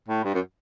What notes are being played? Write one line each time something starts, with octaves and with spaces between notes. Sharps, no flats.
A2
G2
F#2